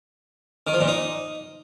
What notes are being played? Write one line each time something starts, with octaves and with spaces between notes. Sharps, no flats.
D#3
F3
A#2
D#4